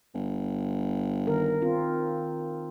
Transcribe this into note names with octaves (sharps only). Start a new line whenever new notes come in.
G1
D#3 A#4
C4 F4